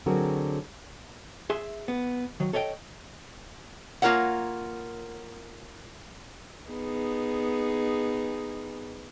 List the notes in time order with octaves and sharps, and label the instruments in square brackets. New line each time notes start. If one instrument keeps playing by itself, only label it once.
[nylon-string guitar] D3 F#3 C4 F#4 G#4 A#4
[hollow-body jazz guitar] G#4 E5 C6
B3
D#3 F#3
A4 C#5 D#5 E5 G5
[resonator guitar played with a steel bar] A#3 F4 A#4 C#5 F#5
[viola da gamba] B3 D#4 G#4